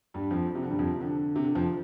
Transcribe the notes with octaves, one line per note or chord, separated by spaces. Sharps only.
G2 G3
F2 F3
C3
D3
G2 G3
F2 F3
C3
D3
C3
D3
F2 F3